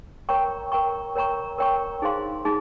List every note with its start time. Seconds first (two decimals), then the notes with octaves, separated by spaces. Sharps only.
0.29 A#4 C#5 G5 A#5 C#6
0.72 A#4 C#5 G5 A#5 C#6
1.16 A#4 C#5 G5 A#5 C#6
1.58 A#4 C#5 G5 A#5 C#6
2.02 D#4 G#4 C5 F5 C6
2.45 D#4 G#4